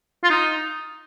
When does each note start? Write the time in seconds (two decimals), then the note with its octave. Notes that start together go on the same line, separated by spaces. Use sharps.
0.24 F4
0.30 D#4